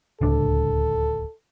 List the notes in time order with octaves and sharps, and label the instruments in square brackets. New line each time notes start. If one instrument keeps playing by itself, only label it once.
[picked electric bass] D1 C#2 D4 [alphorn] A4